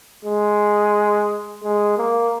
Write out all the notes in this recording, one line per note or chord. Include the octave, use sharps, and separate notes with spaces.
G#3
G#3
A#3